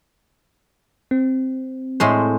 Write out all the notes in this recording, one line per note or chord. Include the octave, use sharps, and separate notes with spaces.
C4
A2 G#3 C5